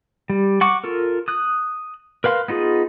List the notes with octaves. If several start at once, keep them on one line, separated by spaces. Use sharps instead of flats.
G3
F#5 C#6 D6
F4 A4 A#4
D#6 F#6
A#4 B4 F5 C6
B3 D#4 F4 G#4